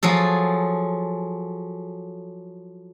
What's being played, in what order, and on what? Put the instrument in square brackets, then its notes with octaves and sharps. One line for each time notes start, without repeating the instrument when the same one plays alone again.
[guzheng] F3 F#3 G#4 A4